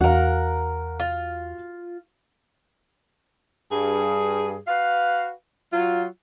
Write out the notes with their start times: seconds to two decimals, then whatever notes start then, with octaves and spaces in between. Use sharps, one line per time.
0.01 E2 F#4 A#4 F5 F#5
1.00 F4
3.71 G2 G#4
4.67 F#4 B4 F5
5.73 F#3 F4